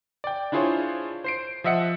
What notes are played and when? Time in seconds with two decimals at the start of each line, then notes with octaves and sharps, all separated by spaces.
0.24 D5 G5
0.52 D4 E4 F4 G#4 C5 C#5
1.24 C5 C7 D7
1.64 F3 D#5 E5 F#5 C#7